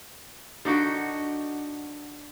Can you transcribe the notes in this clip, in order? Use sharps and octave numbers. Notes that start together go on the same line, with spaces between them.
D3 D#4 F#4 G5